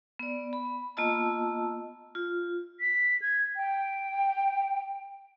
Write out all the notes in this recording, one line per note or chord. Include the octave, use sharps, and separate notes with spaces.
B3 D5
B5
A#3 B3 F4 D#5 A5 E6
F4
B6
G#6
G5